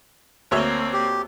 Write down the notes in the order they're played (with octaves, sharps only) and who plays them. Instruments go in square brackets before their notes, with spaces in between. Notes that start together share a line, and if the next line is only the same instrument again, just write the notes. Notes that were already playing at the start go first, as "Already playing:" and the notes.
[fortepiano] D2 C#5 E5 [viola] A#3 C4
[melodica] G4